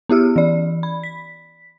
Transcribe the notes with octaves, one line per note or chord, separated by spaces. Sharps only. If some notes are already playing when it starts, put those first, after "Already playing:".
B3 E4 G4 E6 F6
E3 D5
B5
B6